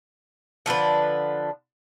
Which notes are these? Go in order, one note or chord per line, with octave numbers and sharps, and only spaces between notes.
D3 F3 D4 B4